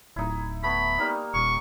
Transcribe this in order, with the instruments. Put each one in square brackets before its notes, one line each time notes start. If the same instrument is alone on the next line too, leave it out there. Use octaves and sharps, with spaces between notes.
[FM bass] D1 [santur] D#4 E4
[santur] A3 B3 [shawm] B5
[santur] G3 A#3 D#4
[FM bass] D#1 [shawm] C#6